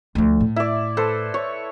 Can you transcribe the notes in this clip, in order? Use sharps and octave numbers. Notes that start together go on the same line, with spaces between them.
D2 F3
A2
E4 D5
A4 B4 C5
C#5